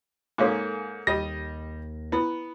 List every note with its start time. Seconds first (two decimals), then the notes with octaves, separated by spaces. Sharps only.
0.38 G#2 A#3 C#4 A4 F5 C6
1.07 D#2 G3 D#5 A#6
2.12 B3 E4 E6